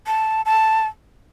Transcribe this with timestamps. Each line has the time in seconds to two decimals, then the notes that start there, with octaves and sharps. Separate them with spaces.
0.07 A5
0.46 A5